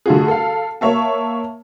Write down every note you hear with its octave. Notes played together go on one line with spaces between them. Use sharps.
D3 A3 F4 F#4 G#4
A4 F5
A#3 C#5 E5 A5